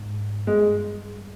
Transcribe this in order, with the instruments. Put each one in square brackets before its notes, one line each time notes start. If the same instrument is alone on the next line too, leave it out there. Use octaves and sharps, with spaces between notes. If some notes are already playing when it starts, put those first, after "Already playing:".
Already playing: [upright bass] G#2
[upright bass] G2 [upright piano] G#3